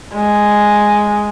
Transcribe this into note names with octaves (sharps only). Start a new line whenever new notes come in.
G#3